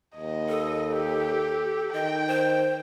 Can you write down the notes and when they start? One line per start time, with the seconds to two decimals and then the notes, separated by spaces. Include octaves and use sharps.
0.16 D#2 D#5
0.49 A4
0.93 G4
1.93 D#3 D#5 G5
2.28 C5